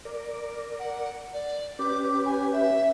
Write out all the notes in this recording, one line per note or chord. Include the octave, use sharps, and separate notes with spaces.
A#4 D5
F#5
D5
C#4 G4 B4 D6
G#5
E5